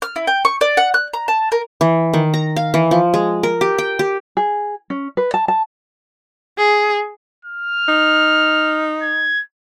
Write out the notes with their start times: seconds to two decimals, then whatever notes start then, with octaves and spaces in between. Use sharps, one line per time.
0.02 F6
0.16 E4
0.27 G5
0.45 C#6
0.61 D5
0.77 F#5
0.94 F#6
1.13 A#5
1.28 A5
1.52 A#4
1.81 E3
2.13 D#3
2.34 A#5
2.56 F5
2.74 E3
2.91 F3
3.14 G#3
3.43 A#4
3.61 G4
3.78 G5
3.99 G4
4.37 G#4
4.90 C#4
5.17 B4
5.34 A5
5.48 A5
6.58 G#4
7.45 F6
7.88 D#4
9.02 G#6